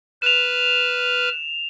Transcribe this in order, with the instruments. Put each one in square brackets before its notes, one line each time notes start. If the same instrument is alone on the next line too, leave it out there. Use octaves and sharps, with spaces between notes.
[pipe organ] B4 F6 [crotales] E7 F7